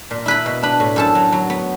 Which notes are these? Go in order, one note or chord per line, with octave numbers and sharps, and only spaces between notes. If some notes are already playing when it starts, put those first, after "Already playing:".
A#2
E4 B4 B5
B2
D4 B4 B5
A2
F#2 A4 A5
F#3
F#3
B3